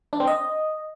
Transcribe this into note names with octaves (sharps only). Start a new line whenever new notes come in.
D4
C4
D#5